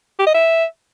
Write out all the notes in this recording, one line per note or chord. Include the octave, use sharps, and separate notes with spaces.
G4
D#5
E5